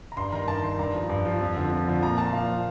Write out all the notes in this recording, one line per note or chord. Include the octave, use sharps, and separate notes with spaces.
A#5
G2 C6
D#3 A#5
G2 A5
D#3 C6
G2 A#5
F3
G2
F3
F2
D3 F3
F2
D3 F3
A#2 A#5
F3 A5
A#2 F5
F3